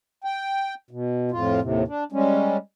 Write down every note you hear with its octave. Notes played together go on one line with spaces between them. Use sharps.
G5
B2
F2 A2 F4
D#2 A2 C3
D4
G3 G#3 C#4